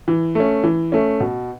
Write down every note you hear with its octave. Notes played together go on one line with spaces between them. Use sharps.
E3
A3 C#4
E3
A3 C#4
B2